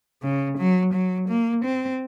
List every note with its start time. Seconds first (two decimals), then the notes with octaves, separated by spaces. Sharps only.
0.23 C#3
0.58 F#3
0.93 F#3
1.29 A#3
1.65 C4